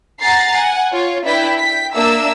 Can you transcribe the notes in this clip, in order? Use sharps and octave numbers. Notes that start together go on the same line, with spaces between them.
F#5 G#5 A#5 A6 C7
F#5 G#5
F4 C#5
D4 E4 B4 G5 B6
G5 B6
A#3 D4 E5 D6 E6